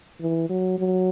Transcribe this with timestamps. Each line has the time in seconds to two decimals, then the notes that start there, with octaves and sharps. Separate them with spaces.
0.21 E3
0.49 F#3
0.78 F#3